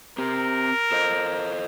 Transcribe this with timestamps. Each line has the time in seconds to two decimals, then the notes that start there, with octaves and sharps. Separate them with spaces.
0.18 C4 G4 A#4
0.92 A4 C5 D#5